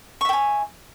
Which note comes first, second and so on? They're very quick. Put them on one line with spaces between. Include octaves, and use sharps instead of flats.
C#6 E5 G5 G#5